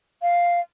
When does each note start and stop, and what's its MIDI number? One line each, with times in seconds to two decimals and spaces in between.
0.22 0.61 77